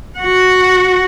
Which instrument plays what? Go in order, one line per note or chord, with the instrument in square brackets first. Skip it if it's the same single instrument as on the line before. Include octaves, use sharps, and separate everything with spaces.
[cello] F#4 F#5